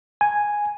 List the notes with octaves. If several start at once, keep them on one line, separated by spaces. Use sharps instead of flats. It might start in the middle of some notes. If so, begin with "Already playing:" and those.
G#5